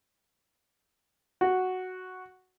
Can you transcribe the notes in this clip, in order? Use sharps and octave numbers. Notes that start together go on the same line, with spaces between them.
F#4